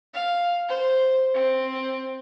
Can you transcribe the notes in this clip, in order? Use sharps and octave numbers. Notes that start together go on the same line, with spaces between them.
F5
C5
C4